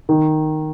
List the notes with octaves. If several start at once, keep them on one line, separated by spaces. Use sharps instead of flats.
D#3